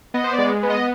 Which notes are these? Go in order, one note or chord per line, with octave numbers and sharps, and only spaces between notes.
B3 D#5
C5
D5
G#3
B3
D#5